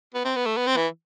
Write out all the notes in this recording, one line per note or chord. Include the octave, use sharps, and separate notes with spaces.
B3
C4
B3
A3
B3
C4
E3